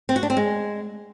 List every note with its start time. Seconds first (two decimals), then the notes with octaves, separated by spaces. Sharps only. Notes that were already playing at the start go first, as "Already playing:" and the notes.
0.09 C4
0.16 F#4
0.23 D4
0.30 C4
0.37 G#3